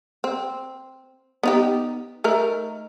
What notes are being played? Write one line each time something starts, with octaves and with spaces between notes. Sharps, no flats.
C4
B3 D#4 G4
A3 D#4 A#4